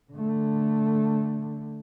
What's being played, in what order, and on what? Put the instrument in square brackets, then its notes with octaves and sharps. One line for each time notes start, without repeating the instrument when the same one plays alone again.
[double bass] D3 A3